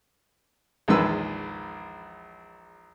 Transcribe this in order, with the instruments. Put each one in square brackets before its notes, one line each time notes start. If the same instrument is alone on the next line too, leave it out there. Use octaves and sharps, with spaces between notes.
[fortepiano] A#1 E2 D#3 G#3 B4 E6